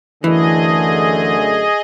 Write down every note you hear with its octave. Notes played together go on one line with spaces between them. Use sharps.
F#2 D3 E3 A3 G#4 D#5